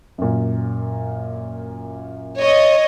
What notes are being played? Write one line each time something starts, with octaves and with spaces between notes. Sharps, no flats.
F#2 A#2
C#5 D#5